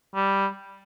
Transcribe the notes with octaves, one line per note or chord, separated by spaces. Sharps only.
G3